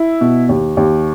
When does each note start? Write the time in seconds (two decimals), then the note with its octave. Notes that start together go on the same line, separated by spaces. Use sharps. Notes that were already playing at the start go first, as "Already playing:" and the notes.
Already playing: E4
0.21 B2
0.49 D#2
0.77 D#2